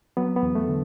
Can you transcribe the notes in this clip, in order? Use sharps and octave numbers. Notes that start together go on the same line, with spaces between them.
F#3 B3
B3
E2
A3
D3